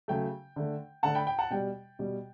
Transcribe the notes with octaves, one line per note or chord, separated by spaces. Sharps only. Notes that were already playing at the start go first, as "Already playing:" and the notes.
C#3 F#3 A3 G5
D3 A3
D3 A3 F#5 A5
G5 B5
G5
F#5 A5
B2 G3 G5
B2 G3